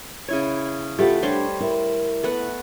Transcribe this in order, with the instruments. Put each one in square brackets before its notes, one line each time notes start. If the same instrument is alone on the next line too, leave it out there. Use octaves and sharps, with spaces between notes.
[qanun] C#3 E4 C#5
[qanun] A3 [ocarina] F4 [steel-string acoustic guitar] G4 B4 F#5
[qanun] G3 C5 C#5 [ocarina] D4
[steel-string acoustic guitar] E4 [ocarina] A#4
[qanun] A3 B3 F#5